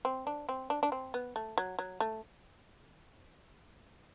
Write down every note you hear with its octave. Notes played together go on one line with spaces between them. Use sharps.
C4
D4
C4
D4
D4
C4
B3
A3
F#3
F#3
A3